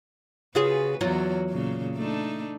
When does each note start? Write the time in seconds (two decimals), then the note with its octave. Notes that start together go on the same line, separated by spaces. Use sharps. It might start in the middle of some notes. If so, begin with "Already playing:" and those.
0.55 C#3 F4 F#4 G#4 B4
1.01 E2 F#3 F4 F#4
1.50 A#2 C#3
1.96 A3 D4 D#4